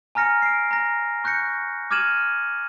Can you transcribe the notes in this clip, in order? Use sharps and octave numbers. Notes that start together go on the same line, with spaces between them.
G#5 A#5 F6 A#6 C#7
C7 D7
A#5 A#6
C#6 F#6 G6 A#6 C#7
D6 F6 G#6 D#7 E7 F#7